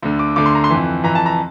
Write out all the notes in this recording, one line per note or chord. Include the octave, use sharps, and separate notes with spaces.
D2 D3
D6
D2 D3 D6
C6
A#5
C6
F2 E3
F2 E3 A#5
A5
A#5